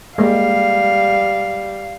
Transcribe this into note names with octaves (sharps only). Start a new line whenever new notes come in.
G3 G#3 A#3 F5